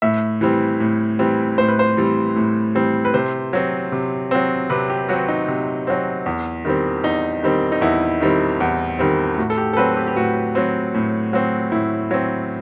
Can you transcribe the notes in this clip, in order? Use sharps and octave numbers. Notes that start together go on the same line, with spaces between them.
A2 E5
E3 G3 C4
A2
E3 G3 C4
A2 C5
B4
C5
E3 G3 C4
A2
E3 G3 C4
B4
C3 C5
F#3 C4
C3
F#3 C4
C3 B4
G4
F#3 C4 F#4
D#4
C3
F#3 C4
E2
D#3 G3 C4
E2 D#4
D#3 G3 C4
D#4
E2 E4
D#3 G3 C4
E2
D#3 G3 C4
A2 F#4
A4
G4
A4
F#3 C4 B4
G4
G4
A2 F#4
F#3 C4
A2
F#3 C4
A2 E4
F#3 C4